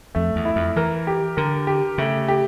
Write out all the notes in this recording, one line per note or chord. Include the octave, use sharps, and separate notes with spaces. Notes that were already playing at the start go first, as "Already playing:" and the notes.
F2 A3
E2
E4
F2
E3 A#4
G4
D3 A#4
G4
C#3 A3
G4